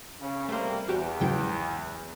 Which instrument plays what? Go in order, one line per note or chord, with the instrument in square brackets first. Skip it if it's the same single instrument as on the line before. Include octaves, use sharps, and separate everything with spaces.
[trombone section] C#3
[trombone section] C3 G3 A#3 [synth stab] A3 C5
[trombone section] E2 [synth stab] F#4 G4
[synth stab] G#2 F#3 G5 [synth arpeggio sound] C#3 G#3 E4